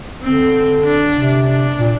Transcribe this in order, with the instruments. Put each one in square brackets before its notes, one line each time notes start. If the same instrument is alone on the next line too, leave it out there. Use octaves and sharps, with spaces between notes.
[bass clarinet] D3 [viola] C4
[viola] D4
[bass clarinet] C3
[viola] D4
[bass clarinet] A#2